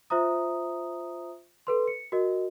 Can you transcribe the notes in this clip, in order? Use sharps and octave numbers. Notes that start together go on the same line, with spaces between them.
F4 C5 E5 A#5 D#6
A4 B4 C6
C#7
F#4 A#4 D#5